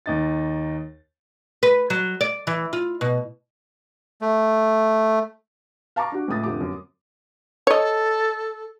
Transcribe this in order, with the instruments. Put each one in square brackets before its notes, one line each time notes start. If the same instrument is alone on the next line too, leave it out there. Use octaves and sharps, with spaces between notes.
[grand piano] D#2 D#4 A6
[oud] B4
F#3
D5
E3
F4
B2
[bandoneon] A3
[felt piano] F5 A5 A#5 C#6 D6
D4 F#4
C#2 A2 D#6 A6
F1 D3 F3 G4 D6
F#2
[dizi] A4 [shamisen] C#5 D#5